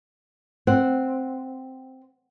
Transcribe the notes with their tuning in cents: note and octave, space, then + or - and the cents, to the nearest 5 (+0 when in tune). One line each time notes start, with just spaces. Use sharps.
C4 +0 F#5 +0